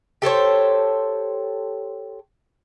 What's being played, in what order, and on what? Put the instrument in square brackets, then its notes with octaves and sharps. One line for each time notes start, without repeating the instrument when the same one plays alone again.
[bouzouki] G4 A4 C5 C#5